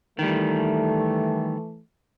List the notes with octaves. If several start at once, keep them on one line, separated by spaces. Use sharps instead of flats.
D#3 E3 G3 A3